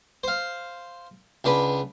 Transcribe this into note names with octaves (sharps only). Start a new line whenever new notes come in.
C5 F5
C#2 D4 B4 B5